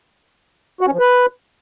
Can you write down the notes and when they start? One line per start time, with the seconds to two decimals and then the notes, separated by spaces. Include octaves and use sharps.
0.81 F#4
0.87 C#4
0.93 F3
0.99 B4